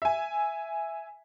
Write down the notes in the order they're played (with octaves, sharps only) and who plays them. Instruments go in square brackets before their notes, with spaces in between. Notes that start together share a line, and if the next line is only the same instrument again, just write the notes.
[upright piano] E5 G#5